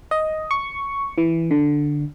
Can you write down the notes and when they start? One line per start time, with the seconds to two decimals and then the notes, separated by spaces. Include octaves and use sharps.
0.11 D#5
0.51 C#6
1.18 E3
1.51 D3